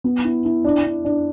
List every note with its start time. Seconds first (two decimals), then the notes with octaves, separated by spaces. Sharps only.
0.04 B3
0.24 E4
0.45 E4
0.65 D4
0.84 D4
1.05 D4